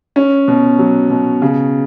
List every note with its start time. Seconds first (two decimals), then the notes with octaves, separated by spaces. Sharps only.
0.16 C#4
0.48 B2
0.79 F#3
1.10 B2
1.42 C#3